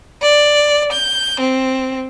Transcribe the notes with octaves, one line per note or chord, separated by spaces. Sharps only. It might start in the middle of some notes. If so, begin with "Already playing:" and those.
D5
G6
C4